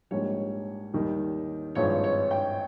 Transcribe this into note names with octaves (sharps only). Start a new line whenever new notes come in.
A#1 G#2 G3 C#5
D#2 D#3 G3
G#1 G2 F3 G#3 C#5
C#5
G5